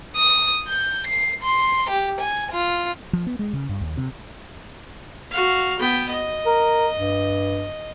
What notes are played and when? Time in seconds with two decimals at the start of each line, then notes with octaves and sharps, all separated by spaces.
0.17 D#6
0.68 G6
1.07 C7
1.43 C6
1.90 G4
2.20 G#5
2.51 F4
3.13 F3
3.27 B3
3.39 G#3
3.53 C#3
3.69 G2
3.81 D#2
3.97 C3
5.31 F#4 F5
5.79 B3 G5
6.09 D#5
6.46 A#4
6.96 G2